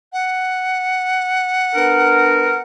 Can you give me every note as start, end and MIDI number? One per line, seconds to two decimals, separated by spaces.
0.13 2.62 78
1.75 2.58 59
1.75 2.58 62
1.75 2.58 70